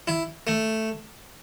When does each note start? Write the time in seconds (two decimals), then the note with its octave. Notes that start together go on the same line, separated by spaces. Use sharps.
0.07 E4
0.47 A3